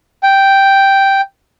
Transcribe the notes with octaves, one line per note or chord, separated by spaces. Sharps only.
G5